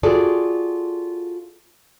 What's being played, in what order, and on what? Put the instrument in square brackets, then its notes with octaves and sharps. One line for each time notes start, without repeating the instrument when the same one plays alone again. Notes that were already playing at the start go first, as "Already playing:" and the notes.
[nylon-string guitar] F4 F#4 G#4 A4 D5